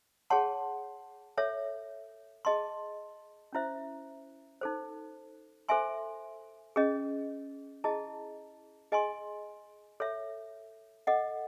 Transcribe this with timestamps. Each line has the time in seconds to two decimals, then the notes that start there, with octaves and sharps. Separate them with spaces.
0.30 G#4 C#5 F#5 A5 C6
1.37 A4 C#5 E5
2.45 G#4 D#5 A5 C6
3.53 C#4 E4 C5 E5
4.61 D#4 A4 C5
5.69 A4 C5 E5 G#5 C6
6.76 C#4 G#4 D#5
7.84 E4 G#4 D#5 A5
8.92 G#4 D#5 G#5 C6
10.00 A4 C#5 E5
11.07 A4 D#5 F#5